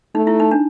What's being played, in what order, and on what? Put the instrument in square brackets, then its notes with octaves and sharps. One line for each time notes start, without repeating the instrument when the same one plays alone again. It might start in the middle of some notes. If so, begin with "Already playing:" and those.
[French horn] A3 [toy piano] D#4
[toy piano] E4
D#4
D4